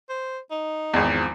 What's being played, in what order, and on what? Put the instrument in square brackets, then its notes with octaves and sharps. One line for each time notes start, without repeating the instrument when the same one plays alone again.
[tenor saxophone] C5
D#4
[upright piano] G#1 E2
[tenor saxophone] F3